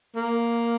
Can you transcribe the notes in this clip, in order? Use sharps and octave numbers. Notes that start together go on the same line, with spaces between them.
A#3